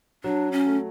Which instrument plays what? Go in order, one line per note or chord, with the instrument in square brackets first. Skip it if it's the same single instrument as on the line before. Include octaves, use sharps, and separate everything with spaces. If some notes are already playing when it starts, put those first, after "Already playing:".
[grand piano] F#3 [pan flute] D4
[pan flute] C#4
[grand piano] A3